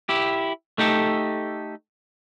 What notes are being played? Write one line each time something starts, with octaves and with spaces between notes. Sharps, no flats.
E4 G4
A3 D#4 G4 A4